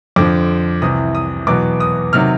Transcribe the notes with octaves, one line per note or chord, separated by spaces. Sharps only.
F2 D3 F3 D6
C2 C3 E3 D#6
D#6
E2 B2 F#3 B3 D6
D#6
C3 D#3 F#3 F6